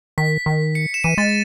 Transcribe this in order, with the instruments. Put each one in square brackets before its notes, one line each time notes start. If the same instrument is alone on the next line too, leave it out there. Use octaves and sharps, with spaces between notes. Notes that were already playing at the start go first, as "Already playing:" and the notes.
[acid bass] D#3 [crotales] B6
[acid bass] D#3
[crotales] C#7
E7
[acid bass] E3 [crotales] D#7
[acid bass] G#3 [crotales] A6